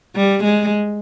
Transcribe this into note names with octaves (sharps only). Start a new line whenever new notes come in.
G3
G#3